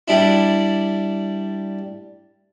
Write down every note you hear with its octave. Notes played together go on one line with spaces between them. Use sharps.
G3 D4 E4